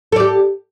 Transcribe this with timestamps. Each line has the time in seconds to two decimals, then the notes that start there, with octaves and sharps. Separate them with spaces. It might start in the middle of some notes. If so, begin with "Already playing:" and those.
0.12 A4
0.16 D5
0.20 G4